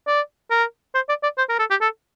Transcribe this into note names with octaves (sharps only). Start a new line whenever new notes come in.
D5
A#4
C5
D5
D5
C5
A#4
A4
G4
A4